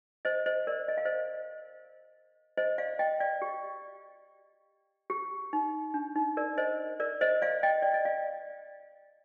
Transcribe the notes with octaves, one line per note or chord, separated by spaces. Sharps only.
C5 D#5
C5 D#5
A#4 D5
D#5
F5
C5 D#5
C5 D#5
D5 F5
D#5 G5
D5 F5
G4
G4
D#4
D4
D#4
A#4 D5
C5 D#5
A#4 D5
C5 D#5
D5 F5
D#5 G5
D5
D#5
D5 F5